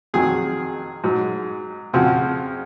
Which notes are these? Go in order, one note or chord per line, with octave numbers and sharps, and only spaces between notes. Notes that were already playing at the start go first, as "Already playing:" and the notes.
F2 D#3 F#3 G#4
G#2 F#3
F2 C#3 F3 F#4